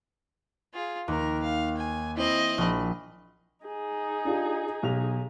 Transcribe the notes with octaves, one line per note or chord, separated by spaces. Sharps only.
F4 G#4
D#2 A#4
F5
G#5
C4 E4 D#5
A#1 B5
D#4 G#4
D4 F4 G4
B1 G4 F7